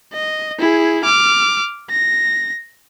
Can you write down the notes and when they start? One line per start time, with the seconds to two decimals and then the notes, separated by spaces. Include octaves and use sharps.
0.13 D#5
0.59 E4 G#4
1.05 D6 F6
1.91 A#6